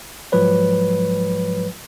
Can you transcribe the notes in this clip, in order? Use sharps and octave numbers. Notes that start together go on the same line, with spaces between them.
G#2 F3 F#3 G#3 B4 C#5